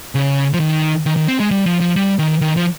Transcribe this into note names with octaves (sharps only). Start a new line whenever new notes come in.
C#3
F3
D#3
D#3
D#3
C4
G#3
G3
F3
F3
G3
D#3
D#3
F3